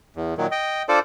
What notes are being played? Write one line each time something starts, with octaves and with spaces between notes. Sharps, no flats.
E2
A#2 D#3 F#3
D#5 G5
D4 F4 A4 C5 D5